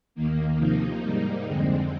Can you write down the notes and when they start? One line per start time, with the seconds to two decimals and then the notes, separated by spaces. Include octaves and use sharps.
0.15 D#2 D#3 A#3
0.57 C3 F3 A#3 D#4
1.00 G#2 G3 A#3 D#4
1.44 F2 D3 G#3 C4